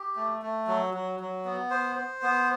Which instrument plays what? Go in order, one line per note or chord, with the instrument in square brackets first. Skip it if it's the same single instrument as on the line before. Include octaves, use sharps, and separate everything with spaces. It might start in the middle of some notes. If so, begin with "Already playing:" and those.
Already playing: [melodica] G4
A3
A3
F#3
F#3
F#3
B3
C5
C5
B3